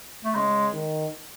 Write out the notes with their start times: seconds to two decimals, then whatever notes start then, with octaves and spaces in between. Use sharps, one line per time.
0.24 A3
0.34 C#3 G#3
0.72 D#3